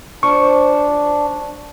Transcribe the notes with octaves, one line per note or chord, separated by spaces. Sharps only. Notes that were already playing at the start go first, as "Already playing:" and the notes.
F3 D4 C#6